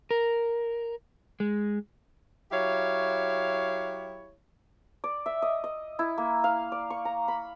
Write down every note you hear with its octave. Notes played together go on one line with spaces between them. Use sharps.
A#4
G#3
F#3 E4 G4 C#5 F5
D5
E5
D#5
D#5
E4
A#3
F5
D5
C#6
A#5
B5